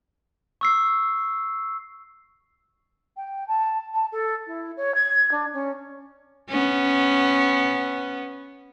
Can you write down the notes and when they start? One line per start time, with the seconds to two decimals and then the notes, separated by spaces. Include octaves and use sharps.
0.61 C#6 E6 C7
3.17 G5
3.48 A5
3.94 A5
4.12 A4
4.47 E4
4.77 C#5
4.94 G#6
5.31 D4
5.53 C#4
6.49 B3 C#4